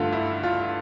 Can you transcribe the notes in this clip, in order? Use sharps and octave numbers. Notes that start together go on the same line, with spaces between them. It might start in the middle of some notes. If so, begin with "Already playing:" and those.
Already playing: G2 D3 A3 F4
E4
F4